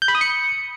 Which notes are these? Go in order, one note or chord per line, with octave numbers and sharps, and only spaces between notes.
G6
B5
D#6
C#7